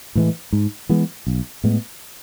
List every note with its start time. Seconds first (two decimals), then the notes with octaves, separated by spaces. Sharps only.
0.15 A2 E3 G#3
0.53 G#2
0.89 E3 G#3 B3
1.27 B1
1.64 A2 G#3 B3